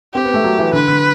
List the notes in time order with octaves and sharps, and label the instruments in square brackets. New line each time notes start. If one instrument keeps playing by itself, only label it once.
[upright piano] C4 [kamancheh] G4
[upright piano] B3
A3
F#3
E3
[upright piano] D3 [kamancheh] B4
[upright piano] D3